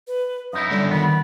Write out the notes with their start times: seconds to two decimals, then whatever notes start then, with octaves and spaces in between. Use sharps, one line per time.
0.08 B4
0.53 F#2 D#4 E4 D#6
0.71 G2 D3 D5
0.91 D#3 B3 B5